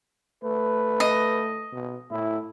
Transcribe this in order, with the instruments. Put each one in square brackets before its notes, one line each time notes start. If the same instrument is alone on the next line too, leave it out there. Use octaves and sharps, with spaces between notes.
[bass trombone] A3 [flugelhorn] B4
[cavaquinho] D#5
[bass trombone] B2
[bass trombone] A2 [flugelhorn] E4